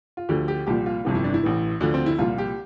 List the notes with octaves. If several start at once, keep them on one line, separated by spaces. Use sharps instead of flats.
F4
D2 D3 F3 G4
G4
C2 A#2 F3 G4
F4
G1 F2 C3 E3 F4
E4
D4
E4
A1 A2 E3
D2 D3 F3 D4
C4
E4
C2 A#2 F3 F4
G4